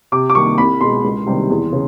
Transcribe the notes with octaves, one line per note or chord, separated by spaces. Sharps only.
C3 D6
D6
D#3 G3 A#3 C#6
C2 B5
B2 G#3 C6
C#2
C3 D#3 G3 C4
E2
C#3